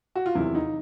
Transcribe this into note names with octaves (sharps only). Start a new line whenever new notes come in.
F#4
F4
E2 C3 D#3 F#3 E4
D#4